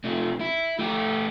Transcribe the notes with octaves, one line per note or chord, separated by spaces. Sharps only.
C3 A3
E4
A3 G4